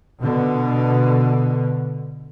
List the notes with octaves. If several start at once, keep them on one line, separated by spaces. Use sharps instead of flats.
B2 D3